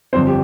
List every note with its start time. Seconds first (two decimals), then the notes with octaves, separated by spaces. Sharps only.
0.13 G1 F2 F3 C4 C5
0.27 G4